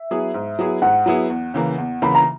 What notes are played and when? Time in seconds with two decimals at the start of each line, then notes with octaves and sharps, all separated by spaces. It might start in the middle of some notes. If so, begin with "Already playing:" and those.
Already playing: E5
0.11 F#3 B3 E4 G#4
0.34 G#2
0.59 F#3 B3 E4 G#4
0.82 G#2 F#5
1.06 F#3 B3 E4 G#4
1.30 E2
1.54 C#3 E3 A#3
1.78 E2
2.02 C#3 E3 A#3 B5
2.15 A#5